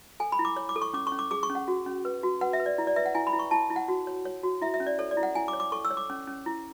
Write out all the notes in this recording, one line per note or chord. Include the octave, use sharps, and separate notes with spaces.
A4 G#5
B5
E4
D6
C#5
D6
A4
C#6
C#4 D6
C#6
C#4
D6
G#4 D6
C#6
C#4
F#5
F#4
C#4
B4
F#4
B4 F#5
E5
B4
D5
E4
D5
B4 E5
F#5
E4 G#5
B5
E4
C#6
E4 A5
E4
F#5
F#4
C#5
C#5
F#4
E4 E5
E5
C#4
D5
A4 C#5
D5
E4
F#5
E4 G#5
D6
C#5
D6
A4 C#6
E6
C#5
D6
C#4
C#4
E4